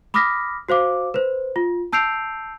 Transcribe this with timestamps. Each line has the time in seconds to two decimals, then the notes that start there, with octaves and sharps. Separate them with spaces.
0.14 B5 D6 D#6 F6 A#6 B6
0.69 F#4 C5 F5 D6
1.14 B4 C5
1.56 F4
1.93 A5 E6 G6 C7 D7 F7